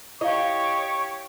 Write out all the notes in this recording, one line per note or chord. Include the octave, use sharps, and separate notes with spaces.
E4 G4 C#5 D#5 F5 C#6